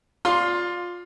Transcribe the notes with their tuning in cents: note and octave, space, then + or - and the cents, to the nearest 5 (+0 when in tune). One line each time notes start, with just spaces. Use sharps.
F4 +15 D5 +0 C6 +0